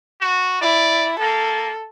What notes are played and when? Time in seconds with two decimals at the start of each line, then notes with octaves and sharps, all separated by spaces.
0.21 F#4
0.61 E4 D5
1.20 A#3 A4